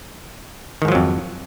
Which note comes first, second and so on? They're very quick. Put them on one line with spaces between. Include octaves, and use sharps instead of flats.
D#3 G#2 F3 F#3 F2